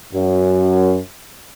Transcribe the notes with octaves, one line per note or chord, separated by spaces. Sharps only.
F#2